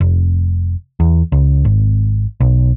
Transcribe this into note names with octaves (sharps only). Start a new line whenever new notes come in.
F1
E2
C#2
G#1
B1